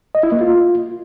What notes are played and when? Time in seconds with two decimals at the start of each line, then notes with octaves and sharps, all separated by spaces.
0.15 D#5
0.23 E4
0.32 A#3
0.41 F4